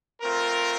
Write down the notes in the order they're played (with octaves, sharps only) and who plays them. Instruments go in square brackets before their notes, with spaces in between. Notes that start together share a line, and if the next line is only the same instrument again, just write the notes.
[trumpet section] A3 C4 F4 A#4